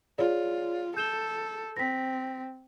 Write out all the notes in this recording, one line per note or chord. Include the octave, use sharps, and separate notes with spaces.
F4 G#4 C#5 D5
A4 G6 E7 G7
C4 A#6 B6